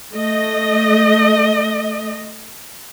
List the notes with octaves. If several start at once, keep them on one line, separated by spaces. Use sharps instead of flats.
A3 D#5